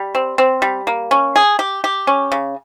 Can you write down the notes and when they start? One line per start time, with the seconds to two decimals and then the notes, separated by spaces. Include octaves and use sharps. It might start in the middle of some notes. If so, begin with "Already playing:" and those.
Already playing: G3
0.15 C4
0.38 C4
0.62 G3
0.87 A#3
1.11 C#4
1.36 G#4
1.59 G4
1.84 G4
2.07 C#4
2.32 C#3